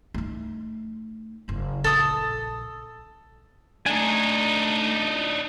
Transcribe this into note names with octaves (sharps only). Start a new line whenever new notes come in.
A3 D#4
F#1 C#3
A#1 A4 D#6
A3 D4 D#4 G#5